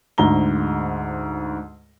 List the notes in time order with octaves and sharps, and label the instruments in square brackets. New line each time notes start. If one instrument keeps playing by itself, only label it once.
[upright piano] D2 G#2 A#5 G7